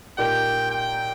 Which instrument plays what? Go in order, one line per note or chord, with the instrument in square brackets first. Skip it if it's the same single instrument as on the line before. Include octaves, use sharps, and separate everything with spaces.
[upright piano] A#2 A#3 D#4 G4 [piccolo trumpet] G5
[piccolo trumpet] G5